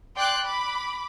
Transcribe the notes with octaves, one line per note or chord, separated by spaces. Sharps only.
D5 G5 C6 D6 F#6
B5 D6